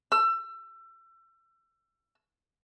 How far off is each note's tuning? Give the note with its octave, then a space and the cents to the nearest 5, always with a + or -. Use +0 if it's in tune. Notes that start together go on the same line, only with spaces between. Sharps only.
E6 +30